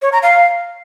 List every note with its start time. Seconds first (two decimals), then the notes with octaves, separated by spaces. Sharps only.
0.02 C#5
0.12 A#5
0.23 F5